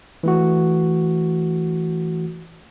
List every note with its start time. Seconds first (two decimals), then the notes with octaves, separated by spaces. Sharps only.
0.23 E3 A3 F#4